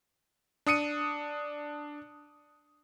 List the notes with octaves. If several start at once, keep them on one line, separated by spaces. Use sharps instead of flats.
D4 D#6 C#7 D#7